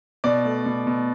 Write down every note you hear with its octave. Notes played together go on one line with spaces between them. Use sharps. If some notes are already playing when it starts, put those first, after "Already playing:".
B2 D5
A3
B2
B2